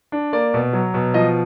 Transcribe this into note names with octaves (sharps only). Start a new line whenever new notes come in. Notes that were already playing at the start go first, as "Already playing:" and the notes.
D4
A#3 D5
B2
F#3
B2
F3 D#5